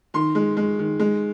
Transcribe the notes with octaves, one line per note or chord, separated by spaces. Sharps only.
D#3 C6
G#3
G#3
D#3
G#3